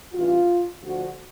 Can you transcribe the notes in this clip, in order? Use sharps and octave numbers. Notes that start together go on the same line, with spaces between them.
A1 G2 E3 F4
D2 D3 F3 F#4